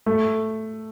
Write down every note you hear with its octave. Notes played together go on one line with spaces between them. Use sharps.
A3